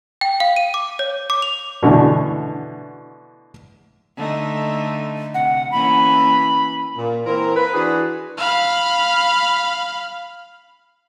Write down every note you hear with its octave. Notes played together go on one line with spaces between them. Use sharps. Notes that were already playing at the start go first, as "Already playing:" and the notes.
G5
F5
D#7
D6
C#5
D6
F7
B2 D3 E3 A3
D3 A3 D#4
C3 F#5
E3 A#3 C#4 B5
A#2
E3 A#3 C4 A#4
B4
E3 D4 F#4 G#4 B4
F5 B5